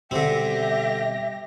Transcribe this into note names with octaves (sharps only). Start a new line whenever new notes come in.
B2 D3 G3 C4 G4 E5 E6 A#6